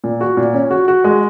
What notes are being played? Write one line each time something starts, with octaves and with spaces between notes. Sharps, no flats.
A#2
F#4
A#2
C#4
F#4
F#4
G#3